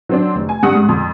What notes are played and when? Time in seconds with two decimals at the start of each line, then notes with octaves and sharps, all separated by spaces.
0.09 F#3 C4 D4
0.36 F1
0.49 G#5
0.63 G2 F#5 D#6
0.75 G#2
0.89 F2